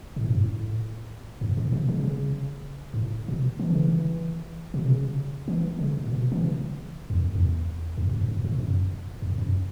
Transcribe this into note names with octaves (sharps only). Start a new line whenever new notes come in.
A2
F#2
A2
F#2
A2
B2
C#3
B2
C#3
F#2
A2
B2
E3
C#3
E3
B2
C#3
E3
C#3
A2
B2
E3
C#3
E2
F#2
E2
E2
F#2
F#2
A2
F#2
E2
F#2